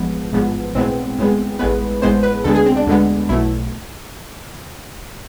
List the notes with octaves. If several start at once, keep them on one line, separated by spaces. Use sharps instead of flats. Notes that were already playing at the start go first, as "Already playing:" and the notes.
Already playing: A1 G#2 F3 B3
A1 G#2 F3 B3
B1 A2 G#3 B3 C4
B1 A2 G#3 B3
A1 A2 G#3 B3 B4
A1 A2 G#3 B3 C5
B4
D2 D3 G#3 B3 A4
G#4
C4
D4
D2 D3 G#3 B3
B1 B2 A3 E4